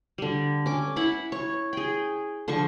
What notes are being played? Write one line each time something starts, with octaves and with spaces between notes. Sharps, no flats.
D3 G3
C#4 D6
E4 F#5 B5
C#5
G#4 G5
D3 F3 C5 C#6